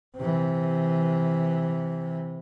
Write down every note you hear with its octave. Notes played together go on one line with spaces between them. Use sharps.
C3 E3